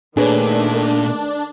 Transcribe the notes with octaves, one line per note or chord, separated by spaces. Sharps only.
A#2 D#3 A3 D4 G#4 B4 C#5